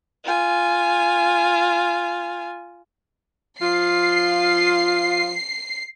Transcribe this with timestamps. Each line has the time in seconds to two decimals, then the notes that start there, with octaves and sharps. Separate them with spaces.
0.24 F4 G#5
3.60 F3 F4 C7